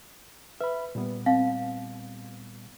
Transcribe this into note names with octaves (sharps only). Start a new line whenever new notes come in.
B4 E5 B5
A#2 G3 B3
C4 F5